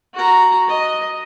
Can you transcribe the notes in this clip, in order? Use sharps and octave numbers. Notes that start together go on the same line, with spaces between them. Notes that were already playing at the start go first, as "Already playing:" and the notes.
F#4 A#5
D#5